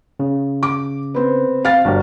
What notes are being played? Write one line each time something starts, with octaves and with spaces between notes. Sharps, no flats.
C#3
D6
B3 C4
C4 F5 F6 A6
G1 D4 F#4 G4